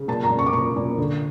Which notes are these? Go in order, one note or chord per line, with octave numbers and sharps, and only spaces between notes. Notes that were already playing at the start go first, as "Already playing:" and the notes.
Already playing: C#3
A#2 A5
A#5
A#2
C#6
D6
A#2 C#6
A#2
D3